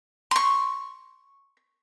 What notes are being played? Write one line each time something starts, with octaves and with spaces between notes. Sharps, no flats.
C6 C#6